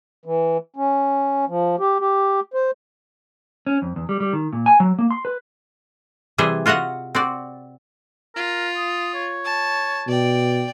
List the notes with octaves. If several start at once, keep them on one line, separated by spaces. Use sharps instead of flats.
E3
C#4
F3
G4
G4
C5
C#4
F2
E2
G3
G3
D#3
A#2
G#5
F#3
A#3
C6
B4
C3 E3 G3 G#4 C5 E5
F4 F#4 D#5 E5 F#5
C4 F#4 D5
F4 A#4
D#6
C#5
A5
B2 D5 G5